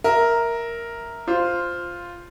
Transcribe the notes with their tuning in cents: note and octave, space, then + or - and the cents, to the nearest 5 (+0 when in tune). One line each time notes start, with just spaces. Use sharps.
A#4 +0 E5 -15
F4 +0 C5 -5